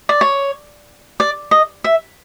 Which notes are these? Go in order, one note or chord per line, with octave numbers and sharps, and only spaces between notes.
D5
C#5
D5
D#5
E5